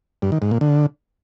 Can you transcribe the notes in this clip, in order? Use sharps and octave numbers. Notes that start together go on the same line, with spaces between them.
G2
D#3
G#2
A#2
D3